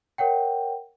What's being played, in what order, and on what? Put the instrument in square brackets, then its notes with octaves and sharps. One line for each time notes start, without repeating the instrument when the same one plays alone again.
[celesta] A#4 C#5 F#5 G5